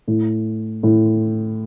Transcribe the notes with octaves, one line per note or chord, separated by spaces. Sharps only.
A2
A2